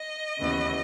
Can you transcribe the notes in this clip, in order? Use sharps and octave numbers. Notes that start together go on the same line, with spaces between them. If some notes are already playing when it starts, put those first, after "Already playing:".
Already playing: D#5
D#2 C#3 E3 B3